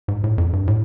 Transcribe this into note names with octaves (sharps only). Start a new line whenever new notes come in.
G#2
A2
F2
G2
A2